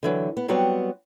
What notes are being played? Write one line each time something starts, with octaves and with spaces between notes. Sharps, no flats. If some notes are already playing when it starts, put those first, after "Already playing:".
D3 E3 F#3
B3
F#3 G3 B3 C4 F#4